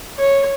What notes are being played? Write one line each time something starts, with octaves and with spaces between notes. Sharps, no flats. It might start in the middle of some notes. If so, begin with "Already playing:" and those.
C#5